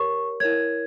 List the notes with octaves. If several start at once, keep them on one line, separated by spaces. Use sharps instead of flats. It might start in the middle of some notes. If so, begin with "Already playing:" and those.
Already playing: G4 A#4 C#5 C#6
E4 A#4 C#5 G#6